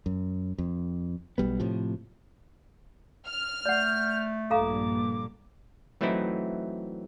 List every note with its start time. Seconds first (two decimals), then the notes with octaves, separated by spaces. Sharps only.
0.06 F#2
0.58 F2
1.38 B1 G3 B3
1.59 A2 C3 F3
3.26 F6
3.66 A3 D5 F#5 G6
4.50 A#1 G2 A#2 A4 F5 A#5 D6
6.01 E3 F#3 A3 C4 D#4 E4